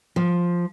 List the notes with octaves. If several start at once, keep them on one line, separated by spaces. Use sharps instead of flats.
F3